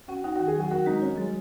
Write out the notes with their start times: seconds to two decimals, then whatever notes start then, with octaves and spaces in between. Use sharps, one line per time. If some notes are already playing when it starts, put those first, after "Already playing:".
0.08 C#4 F#4
0.24 D#4 F#4
0.36 D#3 F#4
0.47 G#4
0.56 F#3 F#4
0.71 F#4 A#4
0.86 G#3 D#4
1.01 C#4 F#4
1.17 F#3 G#3